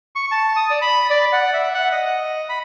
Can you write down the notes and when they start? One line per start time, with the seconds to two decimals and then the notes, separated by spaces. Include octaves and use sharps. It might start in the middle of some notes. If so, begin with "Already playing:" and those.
0.16 C#6
0.31 A5
0.56 D#6
0.70 D5
0.82 B5
1.10 D5
1.32 F#5
1.53 E5
1.74 F#5
1.92 D#5
2.49 B5